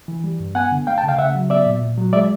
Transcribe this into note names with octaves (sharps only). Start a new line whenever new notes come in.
E3
G3
G2
B3 F#5 G#5
D3
A3 F5 G5
G5 A5
C#3
F5 G5
C#3 E5 F#5
F#3
B3 D5 E5
A#2
A#2
F#3
G#3 D5 E5